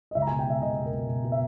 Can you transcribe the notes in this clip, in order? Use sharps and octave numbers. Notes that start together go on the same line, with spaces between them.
D#5
C#2 E5
A#5
G#5
B2
G5
C#2 E5
C#2 D#5
B2
A#4
B2
B2
B2
E5